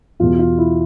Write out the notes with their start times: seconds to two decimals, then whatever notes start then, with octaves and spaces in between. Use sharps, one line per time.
0.20 E2 B2 F4
0.39 F4
0.58 E4